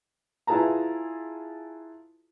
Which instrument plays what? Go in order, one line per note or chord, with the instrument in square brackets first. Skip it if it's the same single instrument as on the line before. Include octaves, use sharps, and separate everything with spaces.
[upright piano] E4 F4 G#4 B4 A5 A#5